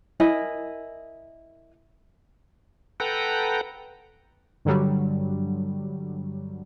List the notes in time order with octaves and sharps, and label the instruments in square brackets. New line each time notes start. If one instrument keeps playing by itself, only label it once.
[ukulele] E4 A#4 D#5 G#5
[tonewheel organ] A4 B4 F#5 G5 A#5
[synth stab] G2 D3 F#3 G3